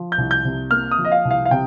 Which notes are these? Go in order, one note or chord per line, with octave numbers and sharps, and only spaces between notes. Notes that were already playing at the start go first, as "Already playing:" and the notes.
Already playing: F3
G6
C2
G6
C3
A#3 F6
D#6
F3
D#5
F5
C2
F5
F5
C3 G5